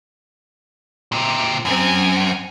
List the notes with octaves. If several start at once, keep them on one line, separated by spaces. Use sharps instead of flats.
A#2 C4
F#2 C4 G#5